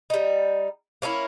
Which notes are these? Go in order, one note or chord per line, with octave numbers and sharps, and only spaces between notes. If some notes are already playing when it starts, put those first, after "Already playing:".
G3 D#4
A#3 C#4 D#4 E4